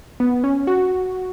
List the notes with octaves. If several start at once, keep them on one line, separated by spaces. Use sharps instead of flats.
B3
C#4
F#4